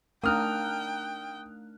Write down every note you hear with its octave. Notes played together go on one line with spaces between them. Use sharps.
A3 D4 D#4 A#4 G5 D#6 F6 F#6